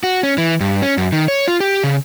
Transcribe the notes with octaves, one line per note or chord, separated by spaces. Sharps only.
F#4
C#4
E3
G2
C#4
F#2
D#3
C#5
F4
G4
C#3